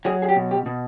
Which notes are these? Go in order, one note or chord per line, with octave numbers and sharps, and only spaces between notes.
F#3 G#4
G#4
G4
B2
G4
B2